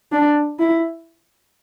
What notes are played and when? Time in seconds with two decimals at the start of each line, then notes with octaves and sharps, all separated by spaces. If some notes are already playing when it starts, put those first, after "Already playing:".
0.12 D4
0.59 E4